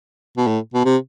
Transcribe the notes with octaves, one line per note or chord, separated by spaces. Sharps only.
B2
A2
B2
C3